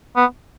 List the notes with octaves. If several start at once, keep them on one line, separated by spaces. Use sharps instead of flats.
B3